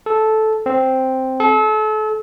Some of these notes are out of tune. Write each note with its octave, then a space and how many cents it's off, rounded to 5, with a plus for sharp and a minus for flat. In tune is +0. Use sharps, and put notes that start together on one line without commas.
A4 -10
C4 +0
A4 -35